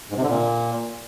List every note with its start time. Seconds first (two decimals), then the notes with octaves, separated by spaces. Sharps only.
0.11 G#2
0.16 C3
0.22 D3
0.28 A#2